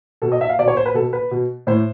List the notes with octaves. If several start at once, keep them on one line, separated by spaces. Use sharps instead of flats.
B2 A4
D#5
E5
F5
B2 D5
C#5
C5
B4
B2 A4
B4
B2
A2 C5